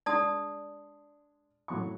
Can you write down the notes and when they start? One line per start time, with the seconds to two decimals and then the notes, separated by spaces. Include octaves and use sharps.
0.06 G#3 D4 D5 A5 C6 D#6
1.68 A2 F#3 C#6